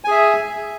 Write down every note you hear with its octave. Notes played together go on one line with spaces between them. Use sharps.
G#4 E5 G#5